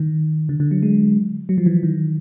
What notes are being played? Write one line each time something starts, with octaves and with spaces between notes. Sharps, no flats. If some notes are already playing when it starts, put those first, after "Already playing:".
Already playing: D#3
D3
D3
F#3
G#3
F#3
F3
E3
D#3